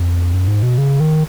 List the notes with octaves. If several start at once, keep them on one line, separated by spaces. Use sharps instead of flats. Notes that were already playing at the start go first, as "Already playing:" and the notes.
Already playing: F2
F#2
G#2
B2
C#3
D#3